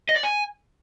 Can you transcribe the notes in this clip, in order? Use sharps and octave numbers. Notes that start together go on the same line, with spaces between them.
D#5
D5
G#5